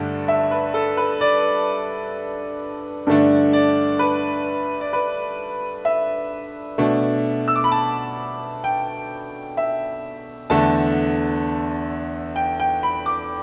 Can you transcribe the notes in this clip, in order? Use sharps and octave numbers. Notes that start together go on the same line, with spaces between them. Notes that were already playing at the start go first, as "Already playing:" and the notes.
Already playing: G2 D3 A3 D4
E5
B4
A4
B4
D5
G2 D3 A3 D4
D5
B4
D5
B4
E5
B2 A3 D4
E6
D6
B5
A5
G5
E5
E2 D3 A3 D4 A5
G5
G5
B5
D6